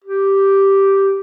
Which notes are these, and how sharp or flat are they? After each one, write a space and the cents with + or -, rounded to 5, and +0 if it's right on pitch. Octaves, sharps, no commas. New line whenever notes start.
G4 -5